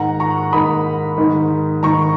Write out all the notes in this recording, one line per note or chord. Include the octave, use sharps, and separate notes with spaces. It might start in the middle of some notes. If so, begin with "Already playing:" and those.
Already playing: G#2 D#3 F#5 A#5
A#5 C#6
G#2 D#3 B5 D#6
G#2 D#3
G#2 D#3 A#5 C#6